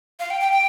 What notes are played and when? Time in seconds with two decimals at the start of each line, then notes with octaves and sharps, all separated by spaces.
0.19 F5
0.30 G5
0.41 G5
0.53 G5